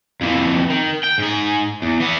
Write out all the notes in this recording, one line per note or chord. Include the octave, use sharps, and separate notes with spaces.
F2 E3
D#3
G5
G#2 G#4
E2
E3 B3